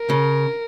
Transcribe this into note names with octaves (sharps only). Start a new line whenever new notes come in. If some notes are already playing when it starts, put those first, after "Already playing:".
Already playing: A#4
C#3